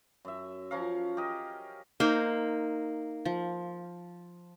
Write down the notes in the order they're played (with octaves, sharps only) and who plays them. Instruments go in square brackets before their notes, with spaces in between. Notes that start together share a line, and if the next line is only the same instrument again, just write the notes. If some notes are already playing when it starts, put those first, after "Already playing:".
[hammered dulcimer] F#2 E5
F3 C#4 A#4 F5
G4 A#4 D#5
[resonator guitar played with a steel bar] A#3 [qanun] D#4 C5
[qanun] F3